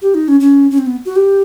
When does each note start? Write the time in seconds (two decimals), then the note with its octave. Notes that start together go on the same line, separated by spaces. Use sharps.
0.02 G4
0.15 D#4
0.28 C#4
0.40 C#4
0.71 C#4
0.78 C4
0.87 B3
1.05 F#4
1.16 G4